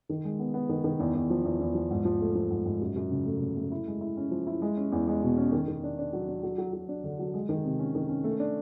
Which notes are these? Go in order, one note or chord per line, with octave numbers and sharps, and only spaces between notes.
D#3
G#3
B3
B3
D#3
D#3
E2
E2
F3
E2
E2
F3
G#2
F3
A3
F3
G#2
G#2
F#2
F#2
C#3
A3
C#3
A3
E4
G#3
E4
C#4
F3
E4
G#3
C#4
E2
G#3
B2
C#4
D#3
D#3
D4
D4
F#3
D4
F#3
F#3
F#3
D4
D3
F#3
G#3
D#3
C3
C#4
D#3
C#4
A3
D4